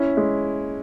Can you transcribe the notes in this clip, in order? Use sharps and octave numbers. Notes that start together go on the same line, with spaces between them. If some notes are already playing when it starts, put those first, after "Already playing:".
Already playing: C#4 E4
G#3